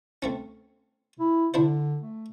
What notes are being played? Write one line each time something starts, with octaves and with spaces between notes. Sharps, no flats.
A3 C4 C#4
E4
D3 D4 E4 C5
A3